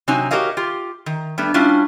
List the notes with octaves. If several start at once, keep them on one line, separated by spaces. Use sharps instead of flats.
C3 F#3 C4 D#4 C#5 G#5
F#4 G4 A#4 C#5 D#5 F5
F4 G4
D#3
G3 A3 B3 D4
G3 C#4 D4 E4 F4